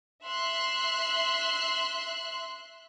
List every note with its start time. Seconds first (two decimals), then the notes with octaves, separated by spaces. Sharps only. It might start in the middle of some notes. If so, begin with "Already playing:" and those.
0.25 E5 C6 F#6